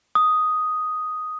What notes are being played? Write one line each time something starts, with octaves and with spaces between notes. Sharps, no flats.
D#6